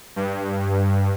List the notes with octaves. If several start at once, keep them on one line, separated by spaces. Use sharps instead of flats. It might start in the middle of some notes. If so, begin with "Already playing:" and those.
G2